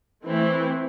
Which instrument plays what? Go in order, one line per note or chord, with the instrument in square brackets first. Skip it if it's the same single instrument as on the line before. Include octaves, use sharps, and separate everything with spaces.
[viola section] E3 A3 C4 E4